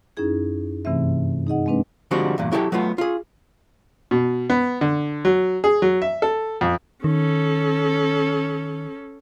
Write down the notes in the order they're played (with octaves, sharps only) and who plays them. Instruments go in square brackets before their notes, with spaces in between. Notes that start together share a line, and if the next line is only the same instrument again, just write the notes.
[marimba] F#2 C#4 D#4 E4 G#4 G#6
G2 C3 E3 A3 C4 E5
D#4 G#4 D#5 F#5
G#3 A#3 C4 D4 B4
[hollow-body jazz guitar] D3 F3 G3 G#3 C4 F#4
E2 G2 A#2
F#3 E4 G4 A4 D5 G5
F#3 A3 B3 F4
F4 G#4
[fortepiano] B2
B3
D3
F#3
G#4
F#3
E5
A4
F2
[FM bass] D#3 [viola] C#4 A4